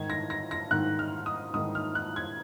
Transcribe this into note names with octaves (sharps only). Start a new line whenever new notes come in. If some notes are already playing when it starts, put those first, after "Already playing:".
Already playing: G#2 D#3 G#6
A#6
A#6
A#6
G#2 D#3 F#6
F6
D#6
G#2 D#3 D#6
F6
F#6
G#6